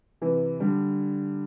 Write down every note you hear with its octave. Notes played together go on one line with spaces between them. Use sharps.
C3 E3
D3 G3